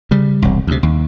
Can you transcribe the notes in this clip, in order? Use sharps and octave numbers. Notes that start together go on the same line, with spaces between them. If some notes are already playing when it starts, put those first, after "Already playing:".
C#3 G3
E1 C2
D2 C3
D#2